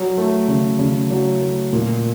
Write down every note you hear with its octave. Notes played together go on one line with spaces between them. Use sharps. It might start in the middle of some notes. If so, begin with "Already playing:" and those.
Already playing: F#3
A3
C#3
C#3
F#3
A3
A#2